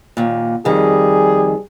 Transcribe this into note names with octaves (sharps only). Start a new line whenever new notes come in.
D#2 A#2
F2 D#3 G3 G#4